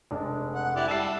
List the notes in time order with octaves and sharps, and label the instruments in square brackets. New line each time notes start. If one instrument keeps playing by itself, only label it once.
[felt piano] F1 G#3 D4
[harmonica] F#5
E4 G4 D5
[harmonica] G3 A5 [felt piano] E5 E6 C7